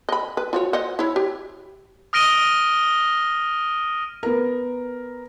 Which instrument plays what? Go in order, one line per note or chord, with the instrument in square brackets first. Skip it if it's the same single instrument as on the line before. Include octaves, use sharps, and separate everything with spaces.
[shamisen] D#5 B5
B4
F4 F#4 C#5
C5 D#5 F#5
E4 C#5
G4
[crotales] D#6 F6 A#6 D7 D#7 G7
[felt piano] B3 A#4